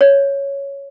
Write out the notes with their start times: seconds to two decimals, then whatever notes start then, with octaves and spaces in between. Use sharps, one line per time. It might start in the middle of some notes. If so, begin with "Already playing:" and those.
0.01 C#5